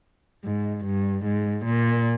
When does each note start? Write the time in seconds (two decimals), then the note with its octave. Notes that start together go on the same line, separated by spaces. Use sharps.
0.44 G#2
0.85 G2
1.25 G#2
1.66 A#2